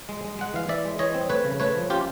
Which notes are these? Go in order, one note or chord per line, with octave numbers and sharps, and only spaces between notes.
G#3
G#3
G#3 F#5
E3 F5
E3 D5 E5
G#3
E3 C#5 D#5
C4
A3 B4 C#5
C#3
A3 B4 C#5
F3
C#4 F4 G4